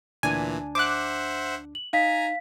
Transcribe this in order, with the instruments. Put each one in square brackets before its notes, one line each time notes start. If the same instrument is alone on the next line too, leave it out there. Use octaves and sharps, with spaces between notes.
[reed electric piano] D2 D4 A5 [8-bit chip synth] A#2 E3 [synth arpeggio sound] G#5
[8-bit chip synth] C5 E5 F#5 [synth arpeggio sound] D6 F#6
[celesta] F#7
[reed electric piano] D#4 [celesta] F5 B6 [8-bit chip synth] G#5 A#5